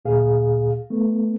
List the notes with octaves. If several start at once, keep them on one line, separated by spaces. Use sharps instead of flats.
D2 A#2 G#4 F5
A3 B3